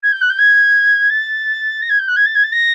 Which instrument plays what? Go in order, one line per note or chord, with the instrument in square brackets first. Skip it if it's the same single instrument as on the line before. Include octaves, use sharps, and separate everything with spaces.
[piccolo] G#6
G6
F#6
G6
G#6
A6
A#6
G#6
G6
F#6
G#6
A6
G#6
A6
A#6